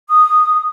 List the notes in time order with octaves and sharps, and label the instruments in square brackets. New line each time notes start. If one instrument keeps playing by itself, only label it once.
[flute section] D#6